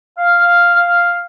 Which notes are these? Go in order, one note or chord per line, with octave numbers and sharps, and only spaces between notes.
F5